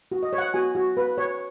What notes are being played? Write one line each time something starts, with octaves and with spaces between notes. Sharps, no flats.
F#4
D#5
C#5
F#5
F#4 G#5
F#4
B4
C#5